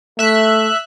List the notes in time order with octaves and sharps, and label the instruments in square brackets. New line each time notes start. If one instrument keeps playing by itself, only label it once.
[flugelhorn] A3 [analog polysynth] E5 F#6